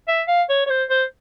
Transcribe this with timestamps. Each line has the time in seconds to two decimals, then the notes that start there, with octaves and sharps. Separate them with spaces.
0.08 E5
0.28 F5
0.49 C#5
0.66 C#5
0.70 C5
0.90 C5